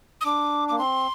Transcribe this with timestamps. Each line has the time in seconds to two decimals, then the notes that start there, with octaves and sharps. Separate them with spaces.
0.21 D#6
0.26 D4 D6
0.68 A#3 D6
0.78 C4 C6